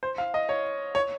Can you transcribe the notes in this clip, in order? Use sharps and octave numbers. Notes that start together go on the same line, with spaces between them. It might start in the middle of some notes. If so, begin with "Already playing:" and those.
C5
F5
D#5
C#5
C#5